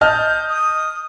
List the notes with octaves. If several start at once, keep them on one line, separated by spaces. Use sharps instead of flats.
D#5 A5 F6 G6
D#6